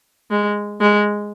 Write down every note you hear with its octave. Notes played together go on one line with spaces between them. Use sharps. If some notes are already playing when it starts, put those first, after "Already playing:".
G#3
G#3